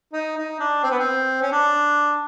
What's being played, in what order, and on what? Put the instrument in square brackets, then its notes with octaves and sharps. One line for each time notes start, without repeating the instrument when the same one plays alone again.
[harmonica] D#4
D#4
D4
C4
B3
C4
C#4
D4